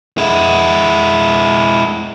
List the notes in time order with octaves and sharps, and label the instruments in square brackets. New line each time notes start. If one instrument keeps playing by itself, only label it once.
[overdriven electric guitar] G#3 E4